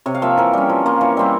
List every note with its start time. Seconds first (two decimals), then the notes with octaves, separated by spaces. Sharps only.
0.06 C3 C#5
0.15 F5
0.22 F3 A#3 E5
0.37 E3 A#4
0.53 G3 C#4
0.69 F3
0.86 A#3 F4
1.01 E3 C#5
1.17 G3 C4 E4 E5